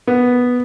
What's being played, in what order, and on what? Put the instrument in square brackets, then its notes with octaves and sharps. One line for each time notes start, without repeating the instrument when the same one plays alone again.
[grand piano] B3